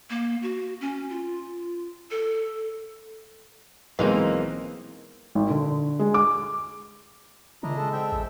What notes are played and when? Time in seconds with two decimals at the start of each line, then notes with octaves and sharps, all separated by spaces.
0.10 A#3
0.43 F#4
0.81 C#4
1.10 F4
2.11 A4
3.99 B1 E3 G#3 A#3 C4 D#4
5.35 G#1
5.50 D3
5.99 G#3
6.14 D6
7.63 A#2 C#3 D4 E4 D#5 A#5
7.77 G#3 A4
7.93 C4 E5 G5
8.12 A1